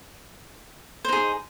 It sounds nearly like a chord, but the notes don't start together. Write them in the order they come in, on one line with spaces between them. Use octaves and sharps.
C5 D#4 G#4